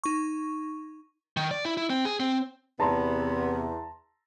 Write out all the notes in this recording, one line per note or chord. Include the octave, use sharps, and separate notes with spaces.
D#4 C#6
D#3
D5
E4
E4
C4
G#4
C4
E2 C3 B3 A5 A#5 C6